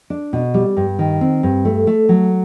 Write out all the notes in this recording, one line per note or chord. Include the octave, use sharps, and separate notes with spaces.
D4
B2
G3
G2
D#3
C4
G2
A3
A3
F#3